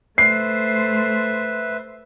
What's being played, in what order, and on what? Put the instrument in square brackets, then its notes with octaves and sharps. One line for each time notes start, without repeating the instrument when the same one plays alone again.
[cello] A3 C5 [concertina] B4 E5 [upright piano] C7